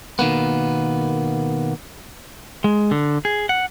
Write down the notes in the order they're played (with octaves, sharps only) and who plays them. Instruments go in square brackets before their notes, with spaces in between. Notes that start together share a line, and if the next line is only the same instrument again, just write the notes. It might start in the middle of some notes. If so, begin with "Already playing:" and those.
[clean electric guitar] B2 D#3 A#3 B3
G#3
D3
G#4
F#5